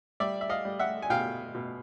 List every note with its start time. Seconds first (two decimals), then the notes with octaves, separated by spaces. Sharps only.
0.20 G3 D5 E5
0.41 E5
0.50 D#5 F5
0.65 G3
0.79 E5 F#5
1.02 G#5
1.10 B2 F5 G5
1.55 B2